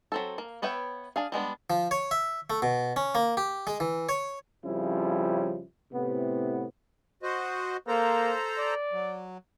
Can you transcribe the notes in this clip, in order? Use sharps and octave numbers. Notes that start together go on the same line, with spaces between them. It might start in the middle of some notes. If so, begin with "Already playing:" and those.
F#3 C4 A4
A#3
B3 B4 C#5 E5 G5
D4 G#4 F5
G3 G#3 B3 D4
F3
C#5
E5
A3
B2
C#4
A#3
G4
G#3
E3
C#5
F2 C#3 F3 G3 C#4 E4
A2 C3 B3
F#4 C5 D#5
A#3 A4 C5 A#5
D5
F#3